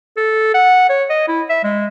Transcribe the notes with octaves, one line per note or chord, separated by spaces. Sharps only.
A4
F#5
C#5
D#5
E4
E5
G#3